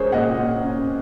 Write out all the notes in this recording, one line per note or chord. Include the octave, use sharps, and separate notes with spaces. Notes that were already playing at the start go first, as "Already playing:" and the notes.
Already playing: G#3 C#4 G#4 A#4 C5 C#5
A#2 D#5 F#5
A#2
C#4